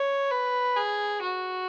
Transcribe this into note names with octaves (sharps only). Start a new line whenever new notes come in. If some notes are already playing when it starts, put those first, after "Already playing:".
Already playing: C#5
B4
G#4
F#4